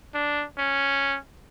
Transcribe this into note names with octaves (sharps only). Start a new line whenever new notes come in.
D4
C#4